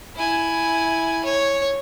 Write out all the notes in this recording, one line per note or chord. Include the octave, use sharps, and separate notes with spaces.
E4 G#5
C#5